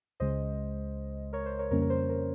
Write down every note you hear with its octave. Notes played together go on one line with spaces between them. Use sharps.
C#2 C#3 G#3 C5 D#5
A#4 C#5
C5
A#4 C#5
F2 C#3 G3 A#3 C#4 A#4 C#5
A#4
C5
A#4